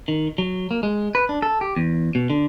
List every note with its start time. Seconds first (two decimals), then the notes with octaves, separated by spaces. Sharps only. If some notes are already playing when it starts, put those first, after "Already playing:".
0.08 D#3
0.38 F#3
0.71 A#3
0.83 G#3
1.15 B4
1.29 D4
1.42 A4
1.61 G4
1.76 E2
2.15 B2
2.30 D3